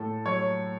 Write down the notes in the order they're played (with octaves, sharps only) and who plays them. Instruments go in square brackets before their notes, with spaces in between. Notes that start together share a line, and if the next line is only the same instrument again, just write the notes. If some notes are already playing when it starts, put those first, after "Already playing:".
Already playing: [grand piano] A2 A4
F#3 C#5